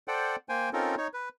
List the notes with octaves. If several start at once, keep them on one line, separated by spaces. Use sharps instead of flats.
A4 C5 D5 F#5 G5
A#3 C5 G5 G#5
C4 C#4 D#4 F4 A4 A#4
D#4 C#5
B4